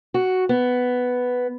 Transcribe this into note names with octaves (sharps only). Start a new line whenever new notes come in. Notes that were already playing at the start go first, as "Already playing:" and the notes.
F#4
B3